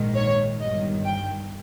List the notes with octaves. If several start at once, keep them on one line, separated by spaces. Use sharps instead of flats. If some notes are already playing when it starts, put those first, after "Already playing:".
Already playing: A#1 G#2 D#3
C#5
G1 G2 D#3 D#5
G5